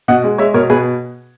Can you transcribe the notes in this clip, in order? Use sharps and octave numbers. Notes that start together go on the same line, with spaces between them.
B2 D#5 F#5
G#3
G#3 C#5 E5
B2 A#4 C#5
B2 G#4 B4